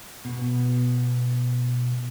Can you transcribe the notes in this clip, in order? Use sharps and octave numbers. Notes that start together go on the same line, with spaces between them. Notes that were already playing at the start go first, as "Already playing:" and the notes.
B2 B3